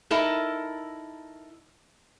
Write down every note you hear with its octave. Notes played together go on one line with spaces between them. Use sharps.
D#4 E4 A4 A#4